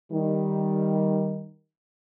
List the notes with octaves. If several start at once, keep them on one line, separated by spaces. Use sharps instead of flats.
D#3 G3